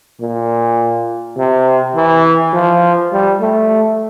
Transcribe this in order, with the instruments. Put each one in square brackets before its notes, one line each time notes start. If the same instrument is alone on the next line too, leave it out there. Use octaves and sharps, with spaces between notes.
[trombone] A#2
C3
E3
F3
G3
A3